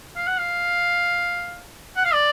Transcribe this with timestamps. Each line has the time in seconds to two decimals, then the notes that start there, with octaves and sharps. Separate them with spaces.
0.16 F5
0.27 F#5
0.38 F5
1.97 F#5
2.05 F5
2.13 D5